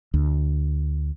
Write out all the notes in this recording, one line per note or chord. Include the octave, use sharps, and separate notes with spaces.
D2